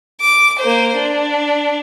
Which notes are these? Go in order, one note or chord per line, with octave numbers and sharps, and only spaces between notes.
D6
A#3 C5
D4